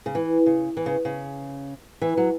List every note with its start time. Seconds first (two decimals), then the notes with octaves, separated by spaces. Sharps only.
0.06 C#3
0.15 E3
0.46 C#3
0.77 E3
0.86 C#3
1.05 C#3
2.02 E3
2.17 F#3